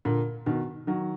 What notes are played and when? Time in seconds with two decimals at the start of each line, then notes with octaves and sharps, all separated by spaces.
0.05 A#2 D3
0.46 B2 D#3
0.87 D#3 F#3